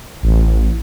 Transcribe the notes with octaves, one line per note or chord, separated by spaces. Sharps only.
A1